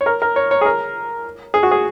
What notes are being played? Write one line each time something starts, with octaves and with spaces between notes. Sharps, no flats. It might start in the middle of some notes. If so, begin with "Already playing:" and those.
C#5
A#4
A#4
C#5
C#5
G#4
A#4
G#4
F#4
G#4